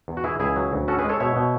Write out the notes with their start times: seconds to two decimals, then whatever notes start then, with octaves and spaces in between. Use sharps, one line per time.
0.08 E2
0.17 F#4
0.24 E3 E4 G#4
0.40 C#2 E4 G#4
0.56 F#3
0.72 D2
0.88 C#4 F#4 A4
0.99 G#4 B4
1.04 G#3
1.09 A4 C#5
1.20 B2 C#5 E5
1.36 B2